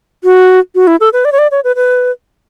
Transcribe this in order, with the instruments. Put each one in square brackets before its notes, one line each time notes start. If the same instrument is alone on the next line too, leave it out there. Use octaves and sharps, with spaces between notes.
[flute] F#4
F#4
E4
A4
B4
D5
C#5
D5
C#5
B4
B4